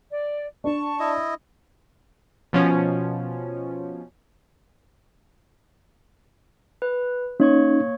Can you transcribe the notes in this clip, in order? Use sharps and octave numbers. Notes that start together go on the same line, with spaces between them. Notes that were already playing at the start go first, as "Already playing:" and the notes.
D5
D4 A5 C#6
E4 D#5
B2 F3 C#4
B4
A#3 C#4 D#4 C#5 C#6